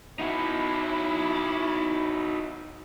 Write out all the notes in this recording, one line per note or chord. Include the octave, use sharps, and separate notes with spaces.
D#4 E4 F#4